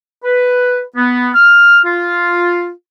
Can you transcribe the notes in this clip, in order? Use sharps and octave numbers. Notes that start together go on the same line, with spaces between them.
B4
B3
F6
F4